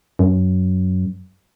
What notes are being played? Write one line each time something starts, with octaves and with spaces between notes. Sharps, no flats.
F#2